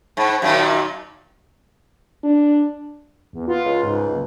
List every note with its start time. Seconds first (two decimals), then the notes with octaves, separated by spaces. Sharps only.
0.17 G#2
0.42 F#2 A#2 D#3
2.24 D4
3.33 E2
3.48 B3 F4
3.65 C#2
3.83 G#2
4.11 F#1